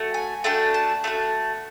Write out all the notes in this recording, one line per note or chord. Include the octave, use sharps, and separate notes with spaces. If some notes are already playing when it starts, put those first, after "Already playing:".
Already playing: A3 F#4
G#5
A3 D4 F#4 G5
A5
A3 D4 F#4